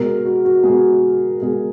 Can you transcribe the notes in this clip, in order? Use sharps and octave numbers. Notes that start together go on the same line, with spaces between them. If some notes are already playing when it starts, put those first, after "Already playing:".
Already playing: B2 G#3 A#4
F#4
F#4
G#3 G#4
B2
B2 G#3 G#4